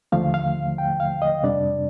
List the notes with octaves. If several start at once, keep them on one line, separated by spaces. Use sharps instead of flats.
D#2 D3 F3 A3 F5
F5
G5
F5
D#5
F2 C3 G3 D4 D5